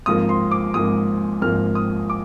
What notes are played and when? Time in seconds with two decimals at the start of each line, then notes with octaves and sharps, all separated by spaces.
0.06 G#1 G#2 F3 A#3 D#6
0.29 C6
0.51 D6
0.74 G#1 G#2 F3 A#3 D#6
1.41 G#1 G#2 F3 A#3 F6
1.75 D#6
2.10 D6